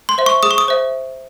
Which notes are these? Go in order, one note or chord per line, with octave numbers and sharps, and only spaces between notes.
C6
C5 E5
C#6
G#4 D#6
C#6
D#6
C5 E5